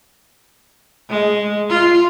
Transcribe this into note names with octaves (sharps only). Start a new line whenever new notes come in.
G#3
F4